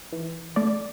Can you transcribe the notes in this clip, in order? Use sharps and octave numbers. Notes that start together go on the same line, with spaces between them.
E3
A3 D5